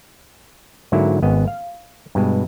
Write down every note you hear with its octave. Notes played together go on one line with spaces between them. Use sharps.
G#2 D3 F#3 A#3 E4 F#4
G#1 B3 C#4 D#5
F5
G2 B2 G#3